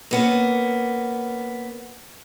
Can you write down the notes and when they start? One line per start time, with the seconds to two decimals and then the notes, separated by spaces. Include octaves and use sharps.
0.11 A#3 B3 C#4